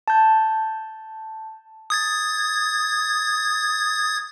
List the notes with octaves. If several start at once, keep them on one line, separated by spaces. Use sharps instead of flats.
A5 G6
D#6 G#6 A6